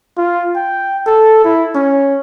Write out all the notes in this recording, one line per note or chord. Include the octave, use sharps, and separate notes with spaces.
F4
G5
A4
E4
C#4